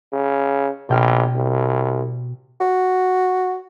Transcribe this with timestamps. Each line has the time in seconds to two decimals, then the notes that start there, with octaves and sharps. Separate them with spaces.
0.13 C#3
0.89 A#1 B2 G5 F6
1.35 C2
2.61 F#4